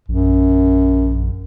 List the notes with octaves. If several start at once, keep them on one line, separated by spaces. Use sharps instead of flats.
A#1 F#2